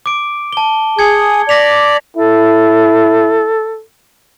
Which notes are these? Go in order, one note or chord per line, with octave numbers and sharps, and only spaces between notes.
D6 D7
A5 G7
G#4 G#6 C#7
D5 A#6 B6 F7
E4 A4